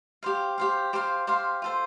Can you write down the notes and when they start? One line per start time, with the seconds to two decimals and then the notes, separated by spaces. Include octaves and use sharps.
0.23 G4 C5 F5
0.58 G4 C5 F5
0.93 G4 C5 F5 C6
1.27 G4 C5 F5 C6
1.62 F4 A4 C5